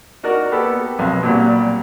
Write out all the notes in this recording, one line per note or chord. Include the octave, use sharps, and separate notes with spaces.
D#4 F#4 A#4 D5
A#3 B3 G4 A4
B1 F2
A#2 F#3 G3